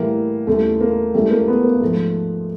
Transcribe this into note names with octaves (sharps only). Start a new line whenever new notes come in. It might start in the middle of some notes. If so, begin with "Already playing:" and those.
Already playing: A2 E3 G3 A#3
D#2 C#3 E3 G3 A3
A#3
C#2 C#3 E3 G3 A3
A#3
B3
A#3
G#2 F3 A3